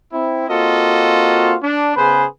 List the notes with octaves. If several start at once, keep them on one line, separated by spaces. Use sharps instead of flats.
C4 E4
A#3 C4 F4 F#4 A4 D#5
D4
C#3 B3 G#4 B4 C5